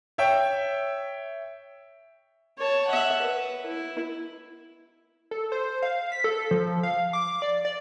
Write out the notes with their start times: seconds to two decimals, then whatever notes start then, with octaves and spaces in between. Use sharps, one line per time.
0.18 C#5 E5 G5
2.58 C#5 A5
2.87 E5 F#5
3.22 B4
3.66 E4
5.31 A4
5.52 C5
5.83 F5
6.12 B6
6.24 A4
6.51 F3
6.83 F5
7.13 D6
7.42 D5
7.65 D5